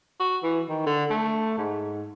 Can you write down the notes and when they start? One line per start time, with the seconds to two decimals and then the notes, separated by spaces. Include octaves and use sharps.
0.20 F#4
0.44 E3
0.69 D#3
0.87 D3
1.10 A3
1.58 G#2